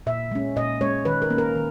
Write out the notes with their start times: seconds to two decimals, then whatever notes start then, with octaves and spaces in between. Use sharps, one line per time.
0.06 A#2 E5
0.32 G#3 C#4
0.56 A#2 D#5
0.81 G#3 C#4 C#5
1.05 D#3 B4
1.22 A#4
1.30 A#3 C#4
1.38 A#4
1.55 D#3